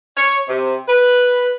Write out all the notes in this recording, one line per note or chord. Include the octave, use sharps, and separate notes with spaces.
C#5
C3
B4